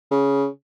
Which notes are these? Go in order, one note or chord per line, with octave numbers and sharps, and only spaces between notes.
C#3